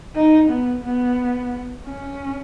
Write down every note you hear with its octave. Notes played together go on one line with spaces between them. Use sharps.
D#4
B3
B3
C#4